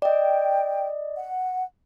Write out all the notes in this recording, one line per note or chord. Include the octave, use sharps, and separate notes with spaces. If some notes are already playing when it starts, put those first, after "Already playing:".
D5 D#5 G5
F#5